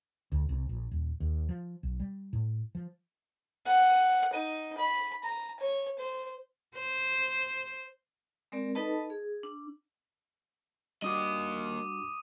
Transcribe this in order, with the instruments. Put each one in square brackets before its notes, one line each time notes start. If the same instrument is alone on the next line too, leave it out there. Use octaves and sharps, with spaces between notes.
[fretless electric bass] D2
C2
A#1
D#1
D#2
F3
B1
G3
A2
F3
[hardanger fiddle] F#5
D#4
B5
A#5
C#5
C5
[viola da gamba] C5
[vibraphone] G#3 C4 A#4 D5
D#4 A4 B4 D#5 A5 B5
G#4
D4
[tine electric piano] G3 D4 F#4 [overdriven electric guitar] A#3 D#5 [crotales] D6 D#6 D#7